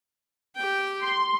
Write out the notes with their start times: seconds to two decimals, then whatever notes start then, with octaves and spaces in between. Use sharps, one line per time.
0.56 G4 G5
1.01 C6